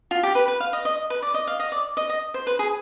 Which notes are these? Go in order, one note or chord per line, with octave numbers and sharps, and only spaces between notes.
F4
G4
B4
B4
F5
D#5
D#5
B4
D5
D#5
F5
D#5
D5
D#5
D#5
C5
B4
G#4